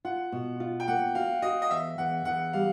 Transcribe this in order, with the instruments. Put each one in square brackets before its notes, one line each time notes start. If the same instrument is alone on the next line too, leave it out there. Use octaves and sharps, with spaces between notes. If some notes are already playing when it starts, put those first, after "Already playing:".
[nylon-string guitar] F4 [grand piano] F#5
[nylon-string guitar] B2
F4
[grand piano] G5
[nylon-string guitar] A#3 [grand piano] F#5
[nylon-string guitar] F#4 [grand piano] F5
[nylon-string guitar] F#4 [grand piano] D#5
[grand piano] D#5
[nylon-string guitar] E2 [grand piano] E5
[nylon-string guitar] E2 [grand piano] F#5
[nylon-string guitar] E2 [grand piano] F#5
[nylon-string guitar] G3 [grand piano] F5